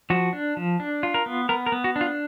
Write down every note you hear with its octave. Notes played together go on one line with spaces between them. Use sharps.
F3 F#4
D4
F3
D4
F4
A#4
B3
B3 A#4
A#4
B3
F#4
D4
F4